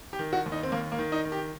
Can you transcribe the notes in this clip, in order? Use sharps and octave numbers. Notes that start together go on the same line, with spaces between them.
G4
D#3
F#4
D#2
D#4
C4
D#2 A#3
A#3
D#3
D#4
D#3
G4